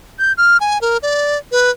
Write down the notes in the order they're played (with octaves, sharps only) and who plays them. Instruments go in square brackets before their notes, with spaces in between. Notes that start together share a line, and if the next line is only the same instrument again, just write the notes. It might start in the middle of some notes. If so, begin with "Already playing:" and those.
[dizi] G6
F6
G#5
A#4
D5
B4